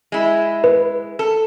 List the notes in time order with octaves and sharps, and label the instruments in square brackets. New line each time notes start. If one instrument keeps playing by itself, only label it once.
[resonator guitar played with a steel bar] G#3 E4
[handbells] B4
[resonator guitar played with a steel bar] A4